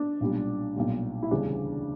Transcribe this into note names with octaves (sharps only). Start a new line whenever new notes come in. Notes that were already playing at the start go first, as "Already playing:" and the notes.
Already playing: D4
B1 A#2 G3
B1 A#2 G3
E4
E1 D2 C#3 G3 D4